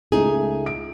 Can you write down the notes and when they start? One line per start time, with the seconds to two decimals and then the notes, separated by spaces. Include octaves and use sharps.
0.12 C#2 A3 D#4 G#4
0.66 D7